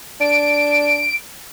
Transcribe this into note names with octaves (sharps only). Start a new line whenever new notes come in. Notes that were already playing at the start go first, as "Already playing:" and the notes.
D4 D7